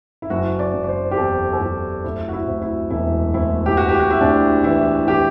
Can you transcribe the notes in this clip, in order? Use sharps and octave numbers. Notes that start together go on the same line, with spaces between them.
E4
F#1 F#4
D5
F#1
D5
C5
G4
E2 A4
A4
F#1 G4
D2 E4
F#4
E4
D2
E4
E1 E4
D2 E4
G4
E3 F#4
G4
F#4
E4
D2 D4
E3 E4
E3 G4